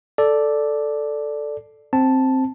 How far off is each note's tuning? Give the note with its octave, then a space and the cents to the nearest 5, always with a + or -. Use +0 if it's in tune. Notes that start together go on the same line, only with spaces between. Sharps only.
A4 +0 D5 +0
C4 +5 A5 +0